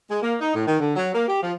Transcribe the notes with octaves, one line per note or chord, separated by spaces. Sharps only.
G#3
A#3
D#4
A2
D#3
D3
F#3
A#3
G4
F3